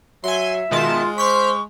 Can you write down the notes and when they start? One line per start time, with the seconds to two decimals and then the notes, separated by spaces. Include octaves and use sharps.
0.24 F#3 E5 G#5 C6
0.71 B2 D#3 G#3 F4 A5
1.18 C5 C#6 F6 G6 B6